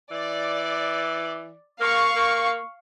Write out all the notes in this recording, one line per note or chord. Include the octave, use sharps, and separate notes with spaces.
E3 D5
A#3 F5 C#6
A#3